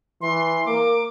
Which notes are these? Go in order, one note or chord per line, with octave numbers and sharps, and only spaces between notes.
E3 C6
A#3 D6